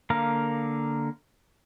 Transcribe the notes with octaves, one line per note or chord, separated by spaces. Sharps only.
D3 A#3 A#4 F5